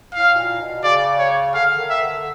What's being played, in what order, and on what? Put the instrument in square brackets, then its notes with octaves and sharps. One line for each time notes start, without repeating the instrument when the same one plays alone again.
[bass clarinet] A2 [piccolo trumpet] F5
[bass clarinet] A#2
B2
[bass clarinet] C#3 [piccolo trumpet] D5
[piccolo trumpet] C#5
[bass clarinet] D3 [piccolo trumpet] F5
[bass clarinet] D#3
[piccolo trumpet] E5
[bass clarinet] D3